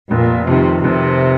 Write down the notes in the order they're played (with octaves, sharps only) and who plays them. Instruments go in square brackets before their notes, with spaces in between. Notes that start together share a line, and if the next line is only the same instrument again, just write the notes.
[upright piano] F1 [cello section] A#2
[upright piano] F2 D#3 [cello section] C3
[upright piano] F1 [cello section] C3